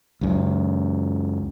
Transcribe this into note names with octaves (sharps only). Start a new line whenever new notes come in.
C#2 F#2